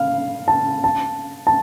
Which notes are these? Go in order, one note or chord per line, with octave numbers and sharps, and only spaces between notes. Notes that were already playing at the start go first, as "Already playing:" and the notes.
Already playing: F5
A5
A5
A5